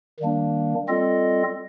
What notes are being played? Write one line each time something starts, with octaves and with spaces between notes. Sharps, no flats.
D#3 G3 A#3 D4
G3 C4 F4 A4 D#5